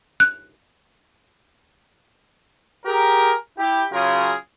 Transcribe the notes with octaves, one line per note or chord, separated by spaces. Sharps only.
F#6
G4 G#4 A#4
E4 G4
C#3 F#3 F4 G#4 A#4